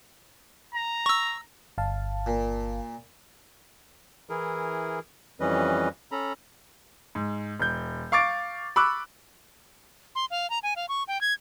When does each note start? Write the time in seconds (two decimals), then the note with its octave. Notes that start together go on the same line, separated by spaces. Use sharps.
0.75 A#5
1.06 C#6 E6
1.78 G1 F5 A5
2.26 A#2
4.30 E3 E4 G#4 A#4
5.40 F2 E3 G3 C#4 B4 D#5
6.12 C#4 A4 A#5 B5
7.15 G#2
7.60 E1 G6
8.12 F5 C#6 D6 A6 D7
8.76 B5 C#6 D6 E6 F#6
10.15 C6
10.30 F5
10.50 A#5
10.63 G#5
10.76 F5
10.89 C#6
11.08 G5
11.21 G#6